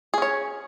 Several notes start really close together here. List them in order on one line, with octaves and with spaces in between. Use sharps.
G#4 C#4 C#5